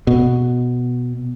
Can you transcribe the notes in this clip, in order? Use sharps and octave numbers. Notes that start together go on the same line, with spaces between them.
B2